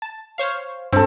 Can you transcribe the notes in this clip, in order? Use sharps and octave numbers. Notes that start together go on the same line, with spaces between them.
A5
C5 C#5 F5
G2 C4 A4